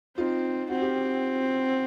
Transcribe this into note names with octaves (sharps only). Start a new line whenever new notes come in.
C4 D#4 F4
C4 F#4
G4